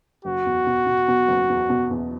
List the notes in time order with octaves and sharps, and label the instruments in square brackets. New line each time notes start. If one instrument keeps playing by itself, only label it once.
[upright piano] F#1 [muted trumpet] F#4
[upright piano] E2
B2
B2
B2
F#1
E2
B2
E2